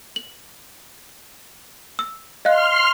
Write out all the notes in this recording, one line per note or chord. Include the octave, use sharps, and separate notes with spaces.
F#7
E6
D#5 F5 C6 F6 F#6